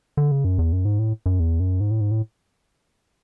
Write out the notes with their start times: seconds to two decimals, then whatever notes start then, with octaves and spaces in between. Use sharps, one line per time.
0.17 D3
0.32 C#3
0.44 F#2
0.59 E2
0.72 F#2
0.85 G#2
0.99 A2
1.26 F#2
1.40 E2
1.60 F#2
1.80 G#2
1.91 A2
2.01 G#2
2.11 A2